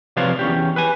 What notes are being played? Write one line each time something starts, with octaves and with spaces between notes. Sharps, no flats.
C3 F3 B4 C#5 D5 F5
E2 C#4 G4
B4 G#5